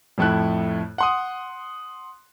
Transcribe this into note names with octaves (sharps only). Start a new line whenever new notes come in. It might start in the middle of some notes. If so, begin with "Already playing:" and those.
F2 A2 A3 E4 F#6
F#5 C6 D#6